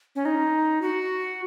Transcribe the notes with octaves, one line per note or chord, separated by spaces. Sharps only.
C#4
D#4
F#4